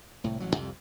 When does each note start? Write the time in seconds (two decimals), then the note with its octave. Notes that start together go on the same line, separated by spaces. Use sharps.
0.24 C2 A2
0.40 A1 F#3
0.54 C2 F2 C3